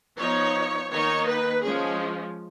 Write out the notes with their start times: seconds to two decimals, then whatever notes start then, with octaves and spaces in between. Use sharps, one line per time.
0.18 F3 B3 D#4 C#5
0.90 D#3 A#3 D#4 C#5
1.26 B4
1.62 F3 G#3 C#4 G#4